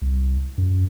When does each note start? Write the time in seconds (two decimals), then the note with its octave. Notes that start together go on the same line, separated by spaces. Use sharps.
0.02 C2
0.58 F#2